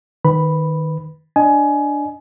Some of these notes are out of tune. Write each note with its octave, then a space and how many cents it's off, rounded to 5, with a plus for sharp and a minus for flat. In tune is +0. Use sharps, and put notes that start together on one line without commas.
D#3 +0 B4 +15 B5 +0
D4 +0 D#5 +5 G#5 +20